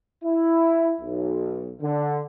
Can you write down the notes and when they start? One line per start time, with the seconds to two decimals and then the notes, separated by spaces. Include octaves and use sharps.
0.25 E4
1.01 B1
1.82 D3